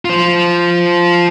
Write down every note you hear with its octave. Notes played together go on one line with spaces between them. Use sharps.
F4 C5